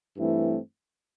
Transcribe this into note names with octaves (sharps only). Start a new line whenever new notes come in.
G2 E3 A3 C4 E4